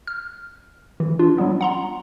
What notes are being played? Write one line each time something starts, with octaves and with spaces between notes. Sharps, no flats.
F6
E3
D4 F4
F#3 G3 B3 C#4
F#5 A#5 C6